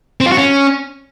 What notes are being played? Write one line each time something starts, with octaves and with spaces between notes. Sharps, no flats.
C4
F4
F#4
C#4